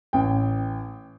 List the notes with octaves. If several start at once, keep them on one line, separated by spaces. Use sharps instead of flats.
A1 G5